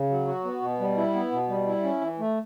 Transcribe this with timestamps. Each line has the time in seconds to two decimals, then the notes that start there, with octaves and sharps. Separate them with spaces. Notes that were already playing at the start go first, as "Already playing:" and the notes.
Already playing: C#3
0.10 F#3
0.27 F#4
0.45 B3
0.62 B2
0.80 G3
0.97 E4
1.14 B3
1.32 B2
1.49 G3
1.67 E4
1.84 C#4
2.01 E3
2.19 A3